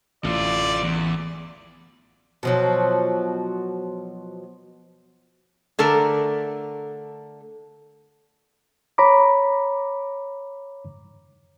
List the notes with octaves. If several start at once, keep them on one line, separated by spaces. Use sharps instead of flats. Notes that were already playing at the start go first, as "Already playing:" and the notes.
A1 A3 F4 D5
E2
B2 F3 F#3
D3 A3 A4 A#4
C#5 A#5 B5 D6